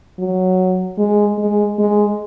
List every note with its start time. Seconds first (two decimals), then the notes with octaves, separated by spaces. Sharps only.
0.19 F#3
0.98 G#3
1.39 G#3
1.79 G#3